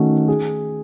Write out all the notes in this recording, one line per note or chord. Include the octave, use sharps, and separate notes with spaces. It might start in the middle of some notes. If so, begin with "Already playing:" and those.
Already playing: D#3 A3 C#4 F#4
G#4